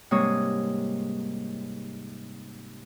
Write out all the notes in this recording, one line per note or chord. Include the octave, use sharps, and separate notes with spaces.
G#2 C3 G3 A#3 C#5 D#6